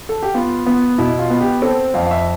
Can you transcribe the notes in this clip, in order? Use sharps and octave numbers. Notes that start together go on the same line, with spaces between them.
A4
G4
B3 F4
B3
B2 E4
F4
B3
G4
C4 A4
F2 F5
F5
E5